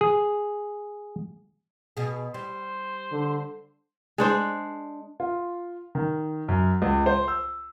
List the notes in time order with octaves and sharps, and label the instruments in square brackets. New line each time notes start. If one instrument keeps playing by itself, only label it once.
[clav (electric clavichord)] G#4
[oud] B2 G#4
[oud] G3 [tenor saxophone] C5
[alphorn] D3
[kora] G#3 D4 C5
[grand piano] F4
D#3
F#2
C#2
C5
E6